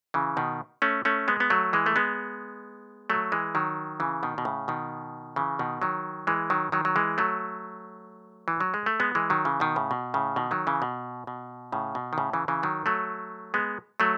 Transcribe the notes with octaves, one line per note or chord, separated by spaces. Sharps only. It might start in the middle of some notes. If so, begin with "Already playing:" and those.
C#3 E3
B2 D#3
A3 C#4
A3 C#4
G#3 B3
B3
F#3 A3
E3 G#3
A3
G#3 B3
F#3 A3
E3 G#3
D#3 F#3
C#3 E3
B2 D#3
B2
A2 C#3
B2 D#3
C#3 E3
B2 D#3
D#3 F#3
E3 G#3
D#3 F#3
D#3 F#3
F#3
E3 G#3
F#3 A3
E3
F#3
G#3
A3
G#3 B3
E3 G#3
D#3 F#3
C#3 E3
B2 D#3
A2 C#3
B2
A2 C#3
B2 D#3
D#3 F#3
C#3 E3
B2
B2
A2 C#3
B2
D#3
A2 C#3
C#3 E3
C#3 E3
D#3 F#3
F#3 A3
G#3 B3
F#3 A3